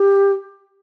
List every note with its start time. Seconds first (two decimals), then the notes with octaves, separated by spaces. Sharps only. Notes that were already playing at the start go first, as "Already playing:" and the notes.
Already playing: G4